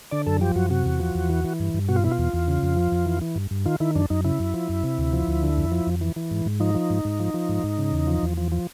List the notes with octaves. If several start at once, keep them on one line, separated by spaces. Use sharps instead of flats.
D3 D5
F#2 A4
F3 G4
F#2 F#4
C3 F#4
E2
F3
E2
E3
E3
G2
G2
B2 F#4
F4
B2 E4
F4
E2
E2
C#3
F2
F3
F2
E3
E3
G2
G2
D#3 F4
D#3 E4
F#2 D4
F#2 D#4
C#3 E4
F#2
F3
F#2
C3
D2
F3
D2
D3
F2
F3
F2
E3
E3
G#2
G#2
F3 D#4
F3
G#2
G#2
F3
F3
G#2
G#2
C#3
E2
F3
E2
F3
F3